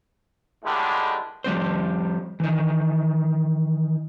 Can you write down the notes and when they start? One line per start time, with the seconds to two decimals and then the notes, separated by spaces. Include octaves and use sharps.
0.64 A2 D3 D#3 G3 G#3
1.44 F3 G3 C4 C5
2.40 D#3 E3